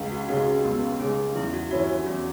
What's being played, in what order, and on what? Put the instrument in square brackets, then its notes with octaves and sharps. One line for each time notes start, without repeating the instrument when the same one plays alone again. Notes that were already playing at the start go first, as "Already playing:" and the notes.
Already playing: [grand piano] C#2
[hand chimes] F#4
[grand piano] C#3 G#3 [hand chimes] F#4
[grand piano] C#2 [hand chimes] B3
[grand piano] C#3 G#3 [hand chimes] C#4
[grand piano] E2 [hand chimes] E4
[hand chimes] F#4
[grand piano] E3 C#4 E4 [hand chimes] F#4
[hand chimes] F#4
[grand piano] E2 [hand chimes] C#4